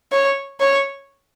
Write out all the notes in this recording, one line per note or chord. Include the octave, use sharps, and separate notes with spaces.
C#5
C#5